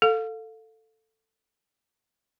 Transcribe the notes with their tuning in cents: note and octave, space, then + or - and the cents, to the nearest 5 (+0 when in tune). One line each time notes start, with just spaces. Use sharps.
A4 +10 F5 +25